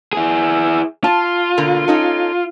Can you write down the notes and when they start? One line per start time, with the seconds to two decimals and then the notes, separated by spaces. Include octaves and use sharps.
0.13 E4 G#4
1.04 F4 A5
1.57 B2 D3 A#3
1.88 C#4 D#4 A4